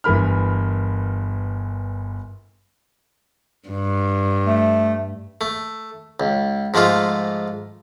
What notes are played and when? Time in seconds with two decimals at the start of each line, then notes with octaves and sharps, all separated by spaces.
0.04 G1 E3 A#4 B5 F6
3.69 G2
4.47 A3
5.41 A3
6.20 C#2
6.74 G#2 F3 G#3 A3 F4